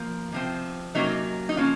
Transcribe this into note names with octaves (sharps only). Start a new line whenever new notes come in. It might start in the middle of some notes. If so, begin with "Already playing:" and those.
Already playing: F3 A#3
C3 F3 C4
C3 F#3 A#3 C#4 D#4
D#4
F3 A#3 C#4 F4